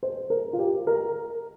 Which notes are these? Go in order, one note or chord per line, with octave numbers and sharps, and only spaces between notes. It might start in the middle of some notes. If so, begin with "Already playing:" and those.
C5
A#4
F4
G4
A#4